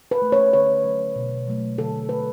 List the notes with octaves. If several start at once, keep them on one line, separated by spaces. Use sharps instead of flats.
B4
A3
C#5
D3 C#5
F#3 A3
B2
F#3 A3
D3 A4
A3 B4